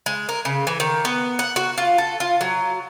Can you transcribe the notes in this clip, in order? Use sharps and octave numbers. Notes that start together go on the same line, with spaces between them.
G#3
A#4
C#3
E3
D#3
B3
F#5
F#4
F4
A4
F4
F#3